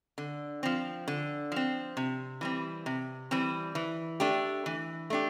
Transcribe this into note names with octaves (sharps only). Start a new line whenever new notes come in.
D3
F3 C4
D3
F3 C4
C3
E3 G3 C4
C3
E3 G3 C4
E3
A3 D4 G4
E3
A3 D4 G4